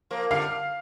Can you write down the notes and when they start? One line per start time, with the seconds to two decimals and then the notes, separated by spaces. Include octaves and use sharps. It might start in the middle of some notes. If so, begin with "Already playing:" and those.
0.11 F3 A#3
0.31 D3 G3 F5